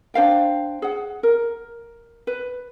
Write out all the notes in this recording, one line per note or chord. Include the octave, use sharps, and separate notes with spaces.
D4 C5 F5 G5
G#4 F#5
A#4
B4